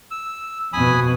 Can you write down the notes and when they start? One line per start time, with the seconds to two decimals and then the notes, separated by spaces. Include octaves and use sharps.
0.11 E6
0.73 F2 B2 G#5 B5 D#6